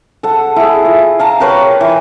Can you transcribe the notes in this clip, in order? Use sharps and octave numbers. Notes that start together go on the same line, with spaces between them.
A4 F#5
E4 G#4
F4
F5 A5 A#5
G4 A#4 B4 C#5
E3